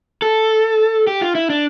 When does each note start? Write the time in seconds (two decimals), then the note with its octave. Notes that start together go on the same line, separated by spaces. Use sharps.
0.22 A4
1.07 G4
1.21 F4
1.35 E4
1.50 D4